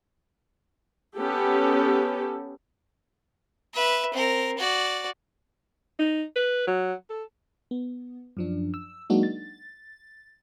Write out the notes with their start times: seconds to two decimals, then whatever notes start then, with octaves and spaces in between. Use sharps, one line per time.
1.17 B3 C#4 G4 A4
3.74 B4 E5
4.13 C4 A#4
4.57 F#4 D5
5.99 D#4
6.36 B4
6.67 F#3
7.10 A4
7.71 B3
8.37 F#2 F3 D4
8.74 E6
9.10 F#3 G#3 A#3 D4 D#4 F#4
9.23 A6